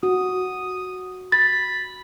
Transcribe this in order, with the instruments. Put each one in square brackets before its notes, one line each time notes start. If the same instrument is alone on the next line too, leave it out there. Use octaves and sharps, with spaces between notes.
[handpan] F#4 [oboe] D#6
[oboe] B5 [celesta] A6